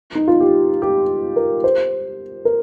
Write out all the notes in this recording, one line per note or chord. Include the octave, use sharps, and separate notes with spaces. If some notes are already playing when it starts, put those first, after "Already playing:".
D#4
F4
G4
G4
A#4
C5
A#4